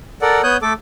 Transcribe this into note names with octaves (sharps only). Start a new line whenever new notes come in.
A4 A#4 D5 F#5
B3 C#5 D#6 F#6 G6
A3 A4 D6